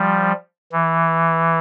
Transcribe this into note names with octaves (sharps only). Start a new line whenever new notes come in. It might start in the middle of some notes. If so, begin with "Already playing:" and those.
Already playing: F3 G3
E3